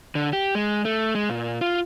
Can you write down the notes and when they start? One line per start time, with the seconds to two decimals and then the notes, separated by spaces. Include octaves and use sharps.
0.15 D3
0.33 G4
0.55 G#3
0.85 A3
1.15 G#3
1.30 A#2
1.61 F4